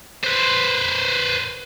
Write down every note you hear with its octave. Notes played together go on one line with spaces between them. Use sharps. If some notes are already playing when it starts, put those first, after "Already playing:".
B4 C5